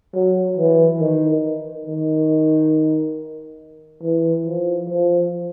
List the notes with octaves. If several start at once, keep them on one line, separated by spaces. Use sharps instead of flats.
F#3
E3
D#3
D#3
E3
F3
F3